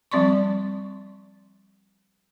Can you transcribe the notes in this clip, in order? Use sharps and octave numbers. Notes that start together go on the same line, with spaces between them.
F3 G3 C4 D5 C6 C#6